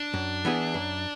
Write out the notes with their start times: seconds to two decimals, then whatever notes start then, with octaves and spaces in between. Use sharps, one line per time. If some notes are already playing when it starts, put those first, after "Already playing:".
Already playing: D4
0.14 F#2
0.45 E3 B3 E4 G#4
0.74 F#2